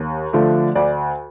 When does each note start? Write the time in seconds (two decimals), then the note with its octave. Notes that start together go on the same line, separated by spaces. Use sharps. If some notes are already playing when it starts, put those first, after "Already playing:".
Already playing: D#2
0.33 D3 F3 A3
0.75 D2 D5